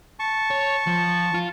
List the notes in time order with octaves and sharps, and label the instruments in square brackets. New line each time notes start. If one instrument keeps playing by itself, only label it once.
[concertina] A5 C#6
[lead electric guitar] C#5
F3
F4